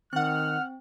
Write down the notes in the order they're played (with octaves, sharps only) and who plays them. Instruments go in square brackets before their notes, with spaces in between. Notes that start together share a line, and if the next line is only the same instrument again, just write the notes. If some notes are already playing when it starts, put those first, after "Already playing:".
[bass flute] D#3 [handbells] C4 [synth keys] F#5 F#6 [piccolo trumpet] F6